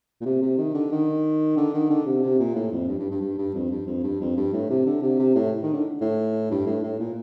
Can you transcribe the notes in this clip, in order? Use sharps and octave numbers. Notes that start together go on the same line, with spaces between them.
A#2
C3
C3
D#3
D3
D#3
D3
D#3
D3
C3
C3
A#2
A2
F2
G2
G2
G2
G2
G2
F2
G2
F2
G2
F2
G2
A2
C3
D3
C3
C3
A2
D#3
D3
A2
G2
A2
A2
A#2